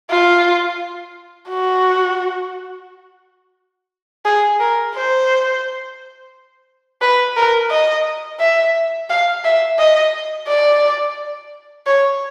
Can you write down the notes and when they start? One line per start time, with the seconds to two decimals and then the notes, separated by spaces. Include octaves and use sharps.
0.10 F4
1.49 F#4
4.25 G#4
4.60 A#4
4.95 C5
7.02 B4
7.36 A#4
7.70 D#5
8.40 E5
9.10 F5
9.45 E5
9.79 D#5
10.48 D5
11.87 C#5